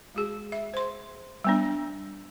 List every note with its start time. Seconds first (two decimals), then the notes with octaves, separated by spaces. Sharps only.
0.15 G#3 F#4 G#4
0.52 E5
0.74 C5 C6
1.44 G3 B3 D4